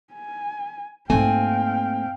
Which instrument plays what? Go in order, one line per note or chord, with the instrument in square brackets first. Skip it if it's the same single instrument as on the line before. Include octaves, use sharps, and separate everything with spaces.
[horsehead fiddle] G#5
[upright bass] G#2 A#3 [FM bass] A3 [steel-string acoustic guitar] C4 G#5 [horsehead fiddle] F5 G5